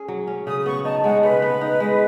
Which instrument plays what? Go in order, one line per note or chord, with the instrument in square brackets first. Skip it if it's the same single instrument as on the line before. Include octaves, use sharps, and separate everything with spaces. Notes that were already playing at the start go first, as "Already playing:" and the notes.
Already playing: [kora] C#4 G#4
F#3
C#4
[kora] C#3 [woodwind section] D#6
[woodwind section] D#6
[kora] B3 [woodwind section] C#6
[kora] D#4 [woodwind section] A5
[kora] G#3 [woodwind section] F#5
[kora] C#3 [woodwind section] B4
[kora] B3
D#4
G#3